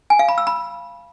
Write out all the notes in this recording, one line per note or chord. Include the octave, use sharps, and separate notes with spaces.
G#5
F5
B5
E6
B5